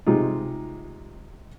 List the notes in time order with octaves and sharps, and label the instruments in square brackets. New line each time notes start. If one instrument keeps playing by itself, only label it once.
[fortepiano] C3 G#3 D#4 F4